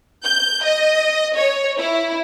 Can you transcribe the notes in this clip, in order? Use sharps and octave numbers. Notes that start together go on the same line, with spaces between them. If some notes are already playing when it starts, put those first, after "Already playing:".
G6
D#5
C#5
E4